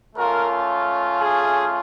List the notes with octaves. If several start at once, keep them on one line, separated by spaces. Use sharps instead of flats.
A3 C#4 F4 A#4
G#4